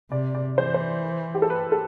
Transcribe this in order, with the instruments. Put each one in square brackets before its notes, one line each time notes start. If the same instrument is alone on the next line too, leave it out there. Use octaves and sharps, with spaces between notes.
[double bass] C3 [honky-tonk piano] D5
[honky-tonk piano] D5
[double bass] E3 [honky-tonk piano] C5
[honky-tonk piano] D5
C5
G4
A4
B4
A4